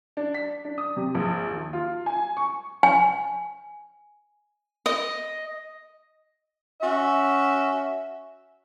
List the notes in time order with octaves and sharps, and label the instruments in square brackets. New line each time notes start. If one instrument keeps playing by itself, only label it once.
[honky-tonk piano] D4
B6
D4
D#6
C3
A#1
D#2
F4
G#5
C#6
[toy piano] G#5
[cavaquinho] D#5
[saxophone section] C#4 F#4 E5